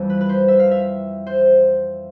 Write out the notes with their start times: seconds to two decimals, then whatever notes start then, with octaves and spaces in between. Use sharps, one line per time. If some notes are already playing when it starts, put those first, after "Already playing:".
Already playing: F2 E3 G3
0.10 B4
0.21 B4
0.29 C5
0.48 E5
0.60 F5
0.71 E5
1.27 C5